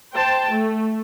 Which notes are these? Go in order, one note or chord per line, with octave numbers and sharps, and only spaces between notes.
C5 G5 A5
A3